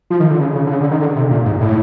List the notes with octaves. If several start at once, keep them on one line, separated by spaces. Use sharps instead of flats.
F3
D#3
D3
C#3
C#3
D3
C#3
D3
D#3
D3
C3
A#2
G#2
A2